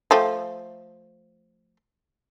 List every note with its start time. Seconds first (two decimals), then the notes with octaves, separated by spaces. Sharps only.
0.11 F3 A3 G5